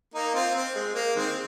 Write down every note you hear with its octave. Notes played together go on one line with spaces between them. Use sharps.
A#3 D#4
C4 F4
C4
G#3
A#3
D#3 G#3 C4